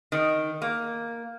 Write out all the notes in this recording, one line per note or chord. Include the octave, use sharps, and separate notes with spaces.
D#3
A#3